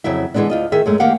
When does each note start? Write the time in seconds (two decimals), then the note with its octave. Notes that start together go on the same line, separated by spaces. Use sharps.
0.04 F2 C#3 F#3 E4 E5
0.34 D3 E3 F#3 G#3 B3 D4
0.50 D2 F4 D#5
0.72 D#3 G#4 E5
0.86 F#2 G#3 A3
1.00 D#3 A#3 G4 F5 F#5